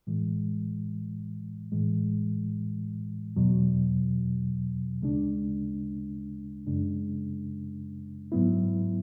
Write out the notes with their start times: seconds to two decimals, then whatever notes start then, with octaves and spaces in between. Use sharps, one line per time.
0.07 A2 E3 G#3
1.72 A2 E3 G#3
3.36 E2 B2 F#3
5.02 D2 C#3 G#3 D4
6.67 F#2 C#3 G#3 D4
8.32 G#2 F#3 B3 E4